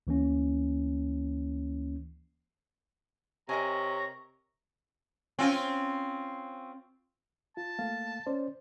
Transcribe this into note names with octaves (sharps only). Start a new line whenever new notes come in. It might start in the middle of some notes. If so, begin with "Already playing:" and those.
D2 E3 A#3 C#4
C3 A#4 C#5 D#5 G#5 A#5
C4 C#4 F4
F4 A5
A3 A#3 F5
C#4 C5 D5